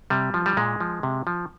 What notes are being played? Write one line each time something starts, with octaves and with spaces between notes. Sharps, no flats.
C3 G3
F3
G3
A#2 G#3
F3
C3
F3